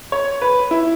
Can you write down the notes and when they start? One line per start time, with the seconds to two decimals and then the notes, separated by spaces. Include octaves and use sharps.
0.12 C#5
0.42 B4
0.71 E4